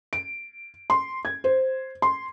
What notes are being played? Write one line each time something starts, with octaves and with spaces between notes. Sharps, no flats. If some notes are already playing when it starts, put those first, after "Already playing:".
D7
C6
G#6
C5
C6